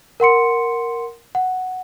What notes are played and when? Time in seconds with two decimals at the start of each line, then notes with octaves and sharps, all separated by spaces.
0.20 A#4 F#5 C6 C#7
1.35 F#5